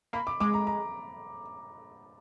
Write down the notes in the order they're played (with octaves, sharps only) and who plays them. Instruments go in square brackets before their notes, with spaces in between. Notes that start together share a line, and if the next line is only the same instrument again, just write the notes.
[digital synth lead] A#3 [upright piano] B5
[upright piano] D6
[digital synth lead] G#3 [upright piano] D6
[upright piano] A#5
A#5